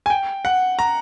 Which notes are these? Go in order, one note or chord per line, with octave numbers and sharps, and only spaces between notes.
G#5
G5
F#5
A#5